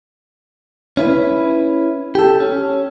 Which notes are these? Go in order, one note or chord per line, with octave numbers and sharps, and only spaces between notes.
C#4 E4 B4
G4 A4
C#4